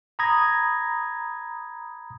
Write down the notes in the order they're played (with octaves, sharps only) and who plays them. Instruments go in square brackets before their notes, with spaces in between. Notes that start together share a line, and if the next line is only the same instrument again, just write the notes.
[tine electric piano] A#5 B5 D#6 G#6 A#6